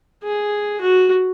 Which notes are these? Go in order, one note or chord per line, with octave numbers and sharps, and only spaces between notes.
G#4
F#4